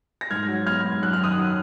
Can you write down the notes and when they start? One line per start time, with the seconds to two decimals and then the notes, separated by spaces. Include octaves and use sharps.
0.21 A#6
0.31 G#2 F6 G#6
0.48 F#3
0.66 B3 F6 G#6
0.85 G#2
1.02 F#2 F#6
1.13 F6
1.20 D#3 D#6 F#6
1.38 F#3